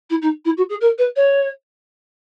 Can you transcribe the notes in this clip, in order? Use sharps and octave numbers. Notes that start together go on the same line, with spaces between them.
E4
D#4
E4
F#4
G#4
A#4
B4
C#5